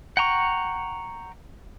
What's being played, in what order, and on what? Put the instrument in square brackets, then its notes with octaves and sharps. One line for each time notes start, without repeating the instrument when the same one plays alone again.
[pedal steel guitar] F#5 G5 A#5 C#6